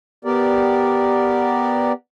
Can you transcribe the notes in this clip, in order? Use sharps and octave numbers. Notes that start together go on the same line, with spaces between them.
B3 G4 A#4 D5